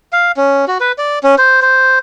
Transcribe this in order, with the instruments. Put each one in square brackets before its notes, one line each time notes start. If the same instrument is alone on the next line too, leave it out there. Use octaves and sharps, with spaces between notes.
[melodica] F5
C#4
F#4
B4
D5
C#4
C5
C5